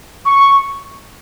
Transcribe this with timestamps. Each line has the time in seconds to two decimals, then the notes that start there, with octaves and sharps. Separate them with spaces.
0.25 C#6